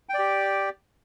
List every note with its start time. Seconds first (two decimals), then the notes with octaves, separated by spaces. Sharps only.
0.09 G5
0.14 D5
0.19 G4